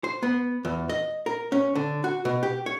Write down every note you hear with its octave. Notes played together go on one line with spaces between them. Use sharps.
C5
B3
E2
D#5
A#4
C#4
D3
F#4
B2
G4
C#5